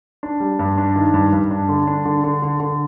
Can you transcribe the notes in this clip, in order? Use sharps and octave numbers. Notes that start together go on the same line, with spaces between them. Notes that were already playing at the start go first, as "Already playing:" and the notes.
D4
G3
G2
D4
D#3
G2
G2
D4
D3
D4
D3
D3
D3
D3